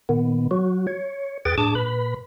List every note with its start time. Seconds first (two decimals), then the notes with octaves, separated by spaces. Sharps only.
0.09 A#2 D#3 B3
0.51 F#3 F#4
0.87 C#5
1.45 E2 G#4 B4 G5 A6
1.58 A2 D4 G#4 A5 D6
1.75 A#2 B4 B5